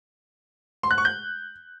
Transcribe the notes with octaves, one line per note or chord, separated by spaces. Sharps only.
C6
F#6
C#6
G6